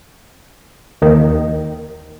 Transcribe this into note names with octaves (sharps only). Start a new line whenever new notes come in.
D#2 D#3